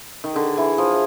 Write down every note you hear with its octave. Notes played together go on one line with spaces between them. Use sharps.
D#3
D3 G#4
E3
F3